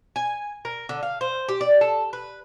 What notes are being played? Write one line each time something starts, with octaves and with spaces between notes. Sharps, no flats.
G#5
A#4
D3
F5
C5
G4
D5
A4
B4